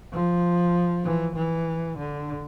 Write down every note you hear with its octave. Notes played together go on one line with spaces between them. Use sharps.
F3
E3
E3
D3